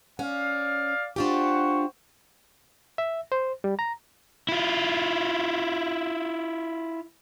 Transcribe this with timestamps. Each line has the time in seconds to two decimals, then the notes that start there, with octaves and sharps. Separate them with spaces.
0.19 C#4 D5 F5
1.16 D4 F4 G4 C5 F#5 C#6
2.98 E5
3.32 C5
3.64 G3
3.79 A#5
4.49 E4 F4